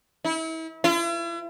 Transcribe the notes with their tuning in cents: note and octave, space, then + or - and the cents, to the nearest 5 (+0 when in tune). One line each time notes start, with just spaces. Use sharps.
E4 -35
E4 +45